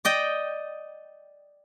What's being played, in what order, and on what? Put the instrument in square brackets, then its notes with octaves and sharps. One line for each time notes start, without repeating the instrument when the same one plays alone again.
[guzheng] D5 D#5 G5